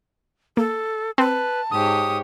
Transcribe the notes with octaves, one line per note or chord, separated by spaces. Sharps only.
A#3 A4
C4 B4 A5
G#2 G4 C#5 D#6